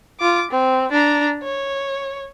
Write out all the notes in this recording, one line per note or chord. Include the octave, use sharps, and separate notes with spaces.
F4 D6
C4
D4 A#5
C#5